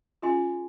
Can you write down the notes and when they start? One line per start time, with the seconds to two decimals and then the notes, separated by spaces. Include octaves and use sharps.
0.22 C#4 F4 G#4 D#5 G#5 C6